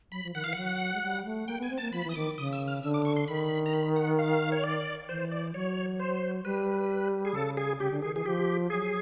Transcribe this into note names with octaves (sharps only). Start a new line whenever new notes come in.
F#3 B5
F3
D#3 F#5
E3 F5
F#3 F#5
G#3
G3
A3
A#3 G5
B3 G#5
C4
A#3 A5
F3 B5
E3 D#6
D#3 D6
C#3 D#6
E6
F6
D3 E6
D6
C#6
C6
D#3 B5
A#5
B5
F#5
F5
C#5
D5
E3 C5
D5
F#3 C#5
C5
G3 B4
G#4
C#3 A4
G#4
C#3 G4
D3
D#3 G#4
E3 G#4
F3 G4
F#3 G#4